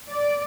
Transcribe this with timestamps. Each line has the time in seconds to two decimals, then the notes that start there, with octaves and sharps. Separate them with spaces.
0.10 D5